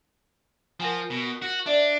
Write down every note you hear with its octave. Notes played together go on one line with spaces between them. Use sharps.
F3 A#4 F#5 G#5
B2
F#4
D4 D5 E5